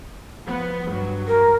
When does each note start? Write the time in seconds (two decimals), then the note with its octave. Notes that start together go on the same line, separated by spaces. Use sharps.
0.46 F3 B3
0.88 G2 F#3
1.27 A#4